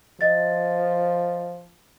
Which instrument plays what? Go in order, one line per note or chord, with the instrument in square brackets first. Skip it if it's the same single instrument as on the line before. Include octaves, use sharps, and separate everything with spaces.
[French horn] F3 [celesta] D#5 A6